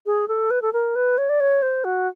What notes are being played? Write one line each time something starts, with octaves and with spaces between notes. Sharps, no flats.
G#4
A4
B4
A4
A#4
B4
C#5
D5
C#5
C5
F#4